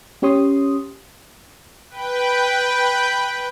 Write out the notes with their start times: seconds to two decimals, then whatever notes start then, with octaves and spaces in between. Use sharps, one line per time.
0.22 C#4 G4 C#5 C6 D#6
1.90 B4 G5